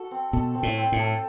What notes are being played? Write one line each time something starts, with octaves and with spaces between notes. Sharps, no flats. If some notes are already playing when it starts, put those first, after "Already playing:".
Already playing: F#4 A4
C4
B2 A4
C4
A2
C4
A2
A4